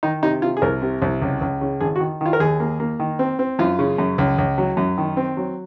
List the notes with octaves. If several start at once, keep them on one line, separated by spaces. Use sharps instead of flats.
D#3 D#4
C3 D#4
C3 F4
G#4
C2 A#4
C3
C2
C#2
C#2
C#3
G#1 G#4
F#4
D#3
D#3 F4
A#4
D#2 G#4
A#3
A#3
D#3
C4
C4
F#2 F4
C#3
F#2
C#2
C#2
F#3
F#2
D#3
C4
F#3